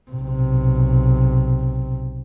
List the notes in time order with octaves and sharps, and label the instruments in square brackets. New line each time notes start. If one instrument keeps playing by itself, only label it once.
[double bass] B1 C3